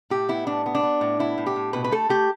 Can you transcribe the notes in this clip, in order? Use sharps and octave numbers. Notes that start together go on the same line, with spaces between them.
A2 G4
B3 E4
A2 D4
B3
D4
B3
A2
B3 E4
A2
G4
A2
B2 B4
B4
A3 A4
A3 G4